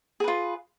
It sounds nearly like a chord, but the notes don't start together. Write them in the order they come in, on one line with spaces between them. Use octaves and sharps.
G#4 B4 F4